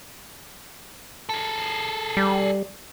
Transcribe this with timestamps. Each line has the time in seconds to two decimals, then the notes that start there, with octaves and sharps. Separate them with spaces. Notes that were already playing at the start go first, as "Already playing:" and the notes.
1.29 G#4 A4
2.17 G3